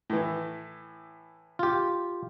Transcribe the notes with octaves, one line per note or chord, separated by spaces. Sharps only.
A2 E3
F4 G4